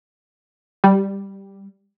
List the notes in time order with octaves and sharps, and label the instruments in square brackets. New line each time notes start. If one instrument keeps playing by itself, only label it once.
[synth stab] G3